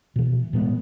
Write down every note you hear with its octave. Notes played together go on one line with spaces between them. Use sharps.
B2 E3
A2 G#3 B3